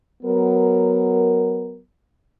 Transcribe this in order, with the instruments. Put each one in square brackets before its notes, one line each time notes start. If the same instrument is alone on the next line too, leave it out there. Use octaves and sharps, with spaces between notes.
[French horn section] F#3 B3 A#4